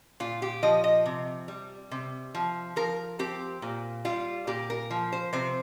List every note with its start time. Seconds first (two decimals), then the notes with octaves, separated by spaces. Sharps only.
0.20 A#2 F4
0.42 G4
0.63 F3 D#5
0.84 D#5
1.06 C3
1.48 G3
1.91 C3
2.35 F3
2.76 F3 A#4
3.19 C4 G4
3.62 A#2
4.05 G3 F4
4.47 A#2 G4
4.70 A#4
4.91 F3
5.13 C5
5.33 C3 C5